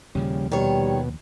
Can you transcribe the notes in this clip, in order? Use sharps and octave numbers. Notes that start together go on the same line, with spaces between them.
D#2 A#2 C#3 F3 G3
B2 D#3 G3 C#5